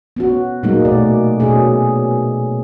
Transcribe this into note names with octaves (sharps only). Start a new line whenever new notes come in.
B3 C#4 F#4
A#2 F#3 G#3 A#3 D#4
B2 A3 D5
B2 C#4 G#4